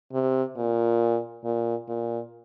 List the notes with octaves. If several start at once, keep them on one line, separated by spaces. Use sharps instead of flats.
C3
A#2
A#2
A#2